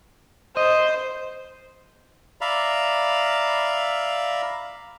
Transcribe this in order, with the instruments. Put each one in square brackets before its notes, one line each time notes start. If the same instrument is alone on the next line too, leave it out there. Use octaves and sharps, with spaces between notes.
[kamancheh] C5 [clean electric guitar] D#5
[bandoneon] D5 E5 F5 A#5 B5